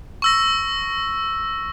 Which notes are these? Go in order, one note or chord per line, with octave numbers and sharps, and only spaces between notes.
C#6 E6 A#6